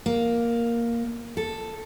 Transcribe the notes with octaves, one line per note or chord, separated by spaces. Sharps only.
A#3
A4